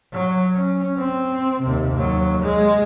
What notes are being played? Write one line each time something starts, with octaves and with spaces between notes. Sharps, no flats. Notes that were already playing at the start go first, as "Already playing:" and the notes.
F#3
C#4
C4
D#2 C3
D#2 F#3
G#3